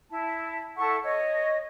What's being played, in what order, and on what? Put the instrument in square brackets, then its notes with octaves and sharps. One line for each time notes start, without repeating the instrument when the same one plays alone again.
[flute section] E4 A5
E4 A4 F#5 C#6
C#5 D#5